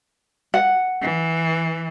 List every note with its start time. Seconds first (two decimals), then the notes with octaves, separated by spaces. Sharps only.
0.54 F#5
1.02 E3